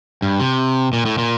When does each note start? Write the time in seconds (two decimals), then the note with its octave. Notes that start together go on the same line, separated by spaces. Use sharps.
0.22 G2
0.40 C3
0.93 A#2
1.06 A2
1.18 A#2